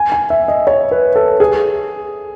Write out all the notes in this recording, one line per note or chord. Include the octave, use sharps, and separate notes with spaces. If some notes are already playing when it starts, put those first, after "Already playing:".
Already playing: G#5
G#5
E5
D#5
C#5
B4
A4
G#4